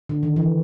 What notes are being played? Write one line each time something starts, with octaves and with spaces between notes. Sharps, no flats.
D3
D#3
E3